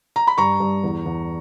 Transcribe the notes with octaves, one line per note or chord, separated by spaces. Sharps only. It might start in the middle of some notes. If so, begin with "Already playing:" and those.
A#5
B5
G2 A#5 C#6
G2
E2
E2